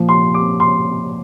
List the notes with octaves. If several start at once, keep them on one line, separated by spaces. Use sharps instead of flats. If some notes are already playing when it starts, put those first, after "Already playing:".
Already playing: A#2 F3
C6
D6
C6